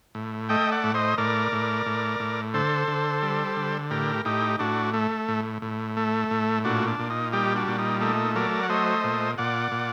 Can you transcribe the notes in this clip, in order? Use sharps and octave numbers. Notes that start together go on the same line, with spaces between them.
A2
A3 D#5 G5
D5 F#5
A2
C5 D#5
A2 A#4 D5
A2
A2
A2
D3 A4 C5
D3
G3
D3
A2 G4 A#4
A2 D#4 G4
A2 D4 F#4
A3
A2
A2
A3
A2
A#2 D4 F#4
D4
A#2
D#4
G3 D#4 G4
D4 F#4
A#2
D#4
A3 D#4
F#3 A#4 D5
F#5
A3 C5 D#5
A#2
A#2 D5 F#5
A#2